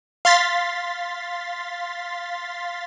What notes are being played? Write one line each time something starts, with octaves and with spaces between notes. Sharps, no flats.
F5 C6 A6 B6